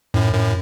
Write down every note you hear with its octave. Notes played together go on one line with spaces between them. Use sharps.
F#2 A2
F#2 A2